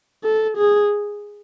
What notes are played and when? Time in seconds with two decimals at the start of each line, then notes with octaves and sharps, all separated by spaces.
0.24 A4
0.57 G#4